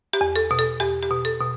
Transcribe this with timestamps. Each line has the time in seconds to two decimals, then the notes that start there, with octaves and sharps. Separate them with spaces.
0.13 G4
0.21 E2
0.36 A4
0.51 B2
0.59 A4
0.80 E2 G4
1.03 G4
1.11 B2
1.25 A4
1.40 B2